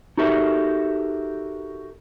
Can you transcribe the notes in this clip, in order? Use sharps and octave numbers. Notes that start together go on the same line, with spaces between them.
D#4 F#4 G4 A4 A#4 E5